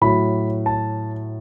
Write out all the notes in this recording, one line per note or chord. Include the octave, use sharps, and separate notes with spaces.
A2 F#3 B5
A5